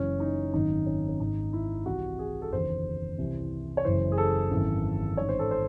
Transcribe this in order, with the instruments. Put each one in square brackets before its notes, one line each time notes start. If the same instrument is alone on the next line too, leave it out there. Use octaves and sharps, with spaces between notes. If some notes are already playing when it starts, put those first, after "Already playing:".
Already playing: [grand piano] F#1 F#2 E3 C#4
D#4
G#1 F#2 D#3 D#4
C#4
C#4
G#1 G#2 D#3 D#4
E4
C2 C3 E3 F#4
G#4
A4
F#1 E2 D#3 C5
C2 C3 E3
C#5
F#1 F#2 E3 C5
G#4
A4
G#1 F#2 E3
A1 G#2 D#3 C#5
C5
A4
C5